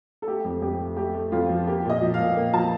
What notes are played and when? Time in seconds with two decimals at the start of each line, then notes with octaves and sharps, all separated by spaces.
0.22 A4
0.26 A3 G4
0.44 F2
0.62 F2 G4
0.79 A3
0.96 A3 G4
1.14 A3
1.32 F2 F4
1.49 F3
1.67 A#3 G4
1.85 A#2 D#5
2.01 F3
2.14 F5
2.19 A#2
2.36 A#3
2.54 F3 A5